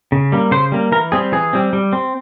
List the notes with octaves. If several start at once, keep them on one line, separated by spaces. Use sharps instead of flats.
C#3
G3 A#3
C#3 C5
G3 A#3
E3 A#4
G3 C4 G#4
E3 G#4
G3 C4
G3
C4